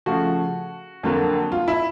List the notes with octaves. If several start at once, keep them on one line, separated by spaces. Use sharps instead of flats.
C#3 F3 A3 F#4
F2 D3 F#3 A#3
F4
E4